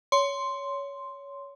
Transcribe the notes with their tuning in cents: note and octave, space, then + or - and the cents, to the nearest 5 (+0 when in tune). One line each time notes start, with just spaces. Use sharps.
C#5 +20 C6 +0